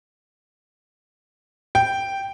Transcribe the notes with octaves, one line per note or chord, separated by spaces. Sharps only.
G5